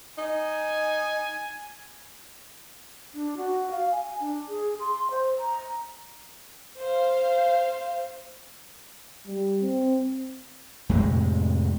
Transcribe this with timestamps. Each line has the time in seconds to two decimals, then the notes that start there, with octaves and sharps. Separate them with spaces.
0.18 D#4 G#5
3.14 D4
3.37 F#4
3.71 F5
3.91 G#5
4.20 D4
4.49 G#4
4.80 C6
5.11 C5
5.39 A#5
6.80 C5 F5
9.27 G3
9.61 C4
10.89 F2 A2 C3 G#3